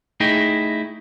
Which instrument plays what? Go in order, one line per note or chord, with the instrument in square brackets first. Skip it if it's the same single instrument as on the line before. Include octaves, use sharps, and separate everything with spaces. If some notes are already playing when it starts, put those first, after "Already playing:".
[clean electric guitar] A3 D#4 E4 G#4 D#5 G5